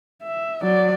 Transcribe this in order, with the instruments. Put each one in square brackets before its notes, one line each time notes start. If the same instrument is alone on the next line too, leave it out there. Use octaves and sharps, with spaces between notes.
[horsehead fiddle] E5
F#3 D5